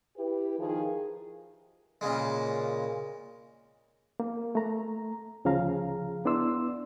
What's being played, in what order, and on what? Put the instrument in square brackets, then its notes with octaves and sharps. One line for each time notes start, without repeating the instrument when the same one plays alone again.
[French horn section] E4 G4 B4
D#3 F3 E4 G#4
[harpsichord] A#2 C#3 G#3
[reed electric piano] A#3
A3 A#5
D2 C#3 F3 G#4 F5 A#5
B3 D4 E4 D5 C6 E6